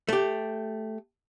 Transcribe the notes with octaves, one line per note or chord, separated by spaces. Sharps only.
A3 G4